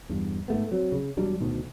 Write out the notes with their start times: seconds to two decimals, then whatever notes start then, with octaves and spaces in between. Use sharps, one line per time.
0.09 E2 G2
0.48 G#2 A3 B3
0.71 F#3 C4
0.92 C#3
1.17 E1 F#3 G3 D4
1.40 D2 B2 D#3